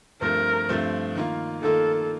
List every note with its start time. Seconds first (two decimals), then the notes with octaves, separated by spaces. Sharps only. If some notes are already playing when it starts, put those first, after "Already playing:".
0.21 G2 F3 A3 C4 A#4
0.69 G2 F3 A3 C4
1.15 D#3 A#3 F4
1.63 D#3 A#3 F4 A4